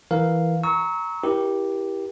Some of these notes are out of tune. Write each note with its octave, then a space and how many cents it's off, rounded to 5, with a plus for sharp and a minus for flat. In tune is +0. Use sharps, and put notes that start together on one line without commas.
E3 +0 A#4 +0 F5 +0
A#5 +0 C#6 +0 E6 -35
E4 +0 G4 +0 A#4 +35